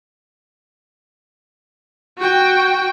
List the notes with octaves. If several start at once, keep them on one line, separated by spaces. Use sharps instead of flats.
F#4 G5